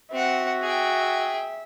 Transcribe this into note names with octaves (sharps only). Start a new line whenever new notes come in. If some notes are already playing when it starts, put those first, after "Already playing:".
C4 F#4 E5 F#5
G#4 G5